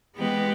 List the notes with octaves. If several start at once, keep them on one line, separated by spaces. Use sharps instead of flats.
E3 G#3 B3 G4 B4